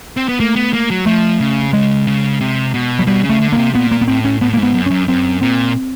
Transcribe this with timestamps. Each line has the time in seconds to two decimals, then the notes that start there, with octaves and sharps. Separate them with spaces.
0.17 C4
0.28 B3
0.40 A3 A#3
0.56 B3
0.73 A#3
0.90 F#3
1.06 F3 A3
1.40 C#3
1.73 C#3 G#3
2.07 C#3
2.41 C3
2.74 B2
2.99 F#3
3.07 B2 G3
3.23 C#3
3.29 A3
3.41 D3
3.52 A#3
3.58 C3
3.74 A#2 B3
3.91 A#3
4.01 B3
4.08 A2 C4
4.25 C#4
4.41 A2 B3
4.54 G#2 A#3
4.63 B3
4.74 F#2
4.86 F#2 C#4
5.08 F#2 C4
5.42 A#2 C4